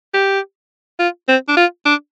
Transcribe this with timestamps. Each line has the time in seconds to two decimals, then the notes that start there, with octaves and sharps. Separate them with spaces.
0.14 G4
0.99 F4
1.28 C4
1.48 D4
1.57 F4
1.85 D4